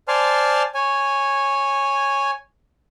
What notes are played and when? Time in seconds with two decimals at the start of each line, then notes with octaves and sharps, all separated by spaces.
0.08 C5 D5 G#5 A5 C6 F6
0.75 C#5 G#5